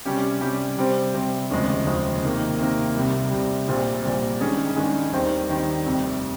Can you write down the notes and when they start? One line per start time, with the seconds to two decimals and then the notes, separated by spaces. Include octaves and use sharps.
0.05 C3 G3 C#4 G4
0.41 C3 G3 C#4 G4
0.77 C3 G3 C4
1.14 C3 G3 C4
1.51 F1 D#2 C#3 F3 G#3
1.86 F1 D#2 C#3 F3 G#3
2.22 C3 D#3 A#3
2.59 C3 D#3 A#3
2.95 C2 C3 G3
3.31 C2 C3 G3
3.68 A#1 A#2 G3 C4
4.04 A#1 A#2 G3 C4
4.40 G2 D#3 G#3 C#4 G#4
4.76 G2 D#3 G#3 C#4 G#4
5.12 D#2 D#3 G3 C4
5.49 D#2 D#3 G3 C4
5.86 F1 F2 C3 G3